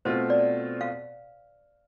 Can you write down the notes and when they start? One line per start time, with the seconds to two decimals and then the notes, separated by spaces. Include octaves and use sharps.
0.05 B2 A3 C4 F4 C5
0.30 D5
0.81 F5